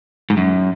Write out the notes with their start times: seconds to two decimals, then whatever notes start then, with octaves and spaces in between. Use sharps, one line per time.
0.30 G#2
0.37 F#2